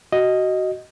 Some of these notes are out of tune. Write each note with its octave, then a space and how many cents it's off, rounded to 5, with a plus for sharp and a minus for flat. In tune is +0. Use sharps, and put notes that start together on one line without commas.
F#4 +20 D#5 +0